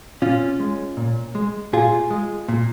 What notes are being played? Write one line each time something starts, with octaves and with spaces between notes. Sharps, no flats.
A#2 C#4 F4
G#3
A#2
G#3
A#2 F4 G#4
G#3
A#2